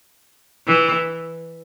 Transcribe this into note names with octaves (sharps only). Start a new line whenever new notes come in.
E3